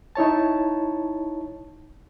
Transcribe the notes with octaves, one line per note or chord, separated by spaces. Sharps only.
D#4 E4 C#5 A5